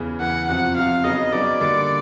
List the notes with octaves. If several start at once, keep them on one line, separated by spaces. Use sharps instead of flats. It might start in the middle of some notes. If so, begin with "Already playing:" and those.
Already playing: E2 C#3 E3
E2 C#3 E3 F#5
F2 C3 F3 F#5
F2 C3 F3 F5
C#3 F#3 B3 D#4 D#5
C#3 F#3 B3 D#4 D5
D3 G3 A#3